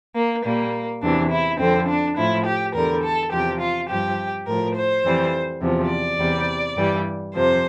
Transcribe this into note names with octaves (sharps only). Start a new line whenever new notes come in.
A#3
A#2 G3 A#3
E2 C3 E3 D4
E4
F2 D3 F3 C4
D4
A2 F3 E4
G4
E2 D3 G3 A#4
A4
E2 C3 F3 G4
F4
G2 F3 G4
A2 F3 A#4
C5
F2 E3 G3
E2 C3 F3
D5
E2 C3 G3
G2 E3 G3
F2 C3 F3 C5